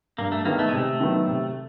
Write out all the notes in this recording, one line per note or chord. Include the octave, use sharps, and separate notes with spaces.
G2 A#3
A3
D#3 G#3 A#3 B3
A3
C3 G#3
A3
D#3 F#3 B3
C3